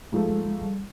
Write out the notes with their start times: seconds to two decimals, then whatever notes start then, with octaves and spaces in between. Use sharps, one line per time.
0.12 G#2 F3 G#3 A3
0.28 G#3
0.45 G#3
0.61 G3